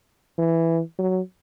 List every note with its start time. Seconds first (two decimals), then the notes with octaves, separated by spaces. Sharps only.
0.38 E3
0.99 F#3